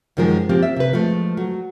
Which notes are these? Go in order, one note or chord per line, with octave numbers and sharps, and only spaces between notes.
F#2 D#3 F3 G#3 A#4
F3 A#3 C4 F4 G4
E5
C3 B4
F3 G#3 A3
F#3